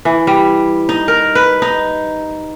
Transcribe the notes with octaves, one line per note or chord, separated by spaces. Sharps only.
E3
G3
D#4
A#4
B4
D#4